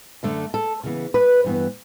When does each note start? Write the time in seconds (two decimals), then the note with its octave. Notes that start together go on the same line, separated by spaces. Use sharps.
0.23 F#2 D3 A3
0.54 A4
0.83 C#3 E3 B3
1.14 B4
1.45 G2 E3 B3